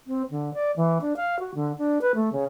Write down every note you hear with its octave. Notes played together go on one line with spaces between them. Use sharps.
C4
D3
D5
E3
D4
F5
F#4
D3
D4
B4
A3
C#3